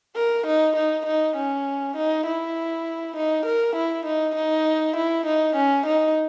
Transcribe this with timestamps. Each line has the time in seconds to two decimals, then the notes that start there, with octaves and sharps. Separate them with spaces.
0.16 A#4
0.47 D#4
0.77 D#4
1.06 D#4
1.36 C#4
1.96 D#4
2.26 E4
3.16 D#4
3.46 A#4
3.76 E4
4.06 D#4
4.36 D#4
4.96 E4
5.26 D#4
5.56 C#4
5.86 D#4